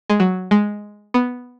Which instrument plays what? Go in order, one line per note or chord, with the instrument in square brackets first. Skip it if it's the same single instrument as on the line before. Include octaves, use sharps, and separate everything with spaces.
[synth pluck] G#3
F#3
G#3
B3